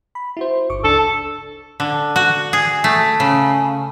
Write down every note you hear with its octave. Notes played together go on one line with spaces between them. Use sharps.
B5
E4 F#4 C5
G1 C#6 D6
C#2 D4 A4
D3
F#4
G#4
A3
C#3